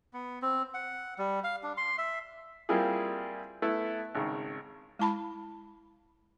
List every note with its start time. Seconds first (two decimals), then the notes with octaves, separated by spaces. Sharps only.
0.13 B3
0.42 C4
0.74 F#5
1.18 G3
1.44 F5
1.63 D4
1.77 C6
1.98 E5
2.69 G3 A#3 C4 E4 F4 G#4
3.62 A3 B3 E4
4.15 G#1 C#3
4.99 G#3 E4 A5 B5